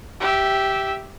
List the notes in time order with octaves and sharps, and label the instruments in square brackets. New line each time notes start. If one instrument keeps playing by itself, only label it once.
[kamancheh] G4 E5